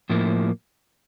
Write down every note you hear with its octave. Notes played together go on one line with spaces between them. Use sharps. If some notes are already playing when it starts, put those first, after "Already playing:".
A2 F3 A#3 E4